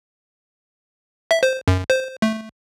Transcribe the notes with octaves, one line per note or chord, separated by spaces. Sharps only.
E5
C5
F#2
C5
A3